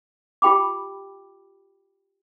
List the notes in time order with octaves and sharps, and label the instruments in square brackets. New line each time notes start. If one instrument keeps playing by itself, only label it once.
[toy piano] F4 G4 G5 B5 D6